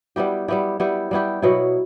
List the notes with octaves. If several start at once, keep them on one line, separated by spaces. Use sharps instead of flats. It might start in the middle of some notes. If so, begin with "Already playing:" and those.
G3 B3 E4 G4
G3 B3 E4 G4
G3 B3 E4 G4
G3 B3 E4 G4
B2 F#3 B3 E4